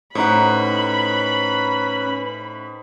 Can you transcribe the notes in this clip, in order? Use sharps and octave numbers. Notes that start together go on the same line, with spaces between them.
A2 C#4 D#4 B4 C5 F#5 B5